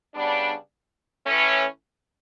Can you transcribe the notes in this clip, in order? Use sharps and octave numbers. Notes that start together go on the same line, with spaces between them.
C#3 G3 B3 D4
A2 E3 A3 C#4